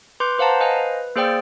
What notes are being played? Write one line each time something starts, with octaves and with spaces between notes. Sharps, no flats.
B4 C6 D6 G6
B4 C5 F5 F#5 A5 A#5
B4 C5 D#5 F5 G#5
B4
A#3 G#4 C5 D5 G5 E6